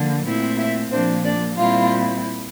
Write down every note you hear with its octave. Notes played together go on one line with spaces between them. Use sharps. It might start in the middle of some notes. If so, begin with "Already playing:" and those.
Already playing: D3 F3 A#3
A#2 A3 C4 E4
E4 E5
A#2 F3 A#3 C4 D4 C5
D4 D5
A#2 G3 C4 E4 F4 F5